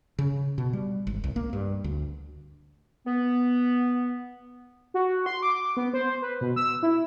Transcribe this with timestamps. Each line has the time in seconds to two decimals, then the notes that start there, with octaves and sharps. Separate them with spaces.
0.19 C#3
0.58 B2
0.73 G3
1.07 G#1
1.24 C2
1.36 A#3
1.53 G2
1.84 D2
3.06 B3
4.94 F#4
5.26 C6
5.43 D6
5.77 B3
5.94 C5
6.22 B4
6.41 B2
6.56 E6
6.83 E4